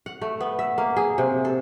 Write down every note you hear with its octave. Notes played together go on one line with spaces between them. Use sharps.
F#5
A3
B3
E5
A#3
G#4
C3
A4